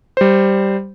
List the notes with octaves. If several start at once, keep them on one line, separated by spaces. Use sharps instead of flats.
G3 C5